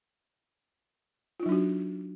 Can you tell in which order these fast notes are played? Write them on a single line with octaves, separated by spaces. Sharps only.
F4 D#4 F#3 D4 F#4